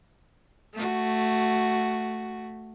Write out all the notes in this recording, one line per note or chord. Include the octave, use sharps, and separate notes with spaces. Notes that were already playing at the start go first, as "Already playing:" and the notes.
A3 F#4